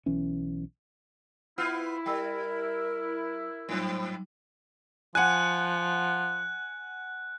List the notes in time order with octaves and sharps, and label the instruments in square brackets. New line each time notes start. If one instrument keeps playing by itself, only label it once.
[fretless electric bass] B1 E3 C#4
[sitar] B3 F4 [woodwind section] E4 [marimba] E6 F6
[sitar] G3 [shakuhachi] A#4 [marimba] G5 B5 E6
[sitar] G#2 C4 [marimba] F#3 G3 D#4
[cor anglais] F3 [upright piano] F#5 G#5 [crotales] F#6